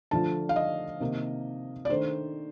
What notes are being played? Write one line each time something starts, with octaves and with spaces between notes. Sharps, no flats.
D3 F3 A3 D4 F4 A5
F5
D#5
C3 D#3 A#3 D#4
D5
D#3 A3 D4 C5